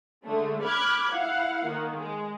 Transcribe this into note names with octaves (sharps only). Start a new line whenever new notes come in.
D3 G#3 A3
B5 D6 F6 F#6 G#6
E4 F5 F#5
D#3 A#3
G#3